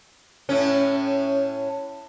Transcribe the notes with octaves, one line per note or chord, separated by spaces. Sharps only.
A2 C#4